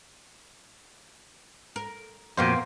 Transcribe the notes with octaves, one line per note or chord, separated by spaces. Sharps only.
A#4
F2 A#2 A#3 B3 F#4 C5 F5 G5